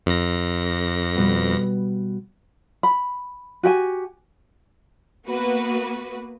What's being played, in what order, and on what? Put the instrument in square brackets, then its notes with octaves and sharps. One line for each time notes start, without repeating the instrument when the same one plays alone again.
[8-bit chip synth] F2 A#6
[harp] B2 G3 B3
[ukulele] B5
F#4 G4 G5 G#5
[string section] A#3 B3 F#4 B4